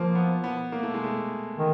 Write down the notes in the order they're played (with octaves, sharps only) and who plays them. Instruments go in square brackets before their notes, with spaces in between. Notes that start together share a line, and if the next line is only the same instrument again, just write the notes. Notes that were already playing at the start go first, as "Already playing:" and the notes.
Already playing: [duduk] F3 [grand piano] A#3
[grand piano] B3
B3
A#3
A3
G#3
A3
[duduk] D#3